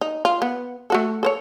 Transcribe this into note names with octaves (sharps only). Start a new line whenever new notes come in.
D#4
F4
B3
A3 F#4 A4
A4 C5 C#5